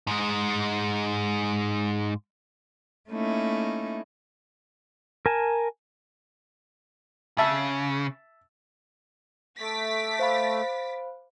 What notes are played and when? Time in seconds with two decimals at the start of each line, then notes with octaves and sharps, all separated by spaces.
0.07 G#2 G#3
3.10 A3 A#3 C#4 D#4 E4
5.26 A#4 G#5 A5
7.38 C#3 E5 A5
9.59 A3 D6 A6 B6
10.19 C5 F5 B5